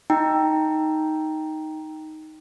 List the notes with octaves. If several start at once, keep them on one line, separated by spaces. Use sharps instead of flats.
D#4 G5 A#5